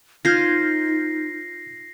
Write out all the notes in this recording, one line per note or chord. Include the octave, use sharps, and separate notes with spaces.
D#4 F4 C5 F6 G6 G#6 A#6 C7